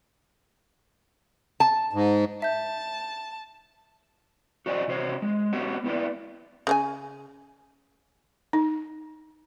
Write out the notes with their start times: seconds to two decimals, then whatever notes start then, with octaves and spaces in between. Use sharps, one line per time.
1.60 A5
1.93 G#2
2.42 E5 A5 G6
4.66 F#4 C5 D5 D#5 F#5 G#5
4.88 C3 F#4 C5 C#5
5.22 G#3
5.53 B3 F#4 G4 C#5 F#5
5.84 B3 E4 B4 D5
6.67 C#3 C#4 G#5
8.53 D#4